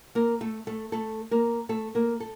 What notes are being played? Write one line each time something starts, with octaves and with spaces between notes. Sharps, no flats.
A#3 A#4
A3 A4
A3 A4
A3 A4
A#3 A#4
A3 A4
A#3 A#4
A4